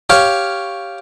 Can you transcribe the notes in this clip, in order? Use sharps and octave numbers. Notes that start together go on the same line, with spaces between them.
G4 C#5 F5